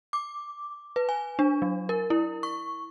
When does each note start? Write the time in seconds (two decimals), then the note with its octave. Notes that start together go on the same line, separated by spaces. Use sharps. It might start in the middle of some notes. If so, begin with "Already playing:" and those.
0.13 D6
0.96 B4
1.09 G#5
1.39 D4
1.62 F#3
1.89 A#4
2.10 E4
2.43 C#6